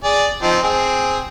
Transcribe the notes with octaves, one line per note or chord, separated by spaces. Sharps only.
G#4 D5
F3 C4 D#4
C4 G#4